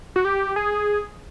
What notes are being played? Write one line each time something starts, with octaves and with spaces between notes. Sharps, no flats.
F#4
G4
G#4